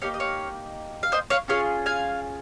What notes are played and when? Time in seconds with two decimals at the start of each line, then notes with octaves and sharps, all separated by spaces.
0.02 A#3 D#4 G4 C#5 F5
0.14 D#5
0.20 C#5 F5
1.03 F5
1.12 C5 D#5
1.30 C#5 F5
1.48 C#4 F4 G#4 C#5 F5
1.86 F5 G#5